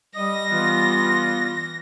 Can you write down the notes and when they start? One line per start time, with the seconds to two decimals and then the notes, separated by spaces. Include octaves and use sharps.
0.15 G3 D#5 A#6
0.51 E3 B3 F4